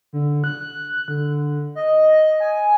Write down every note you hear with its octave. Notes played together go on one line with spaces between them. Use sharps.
D3
F#6
D3
D#5
G#5